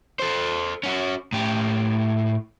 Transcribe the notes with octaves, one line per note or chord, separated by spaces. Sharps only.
A4 C5
C#4 F#4
A2 G4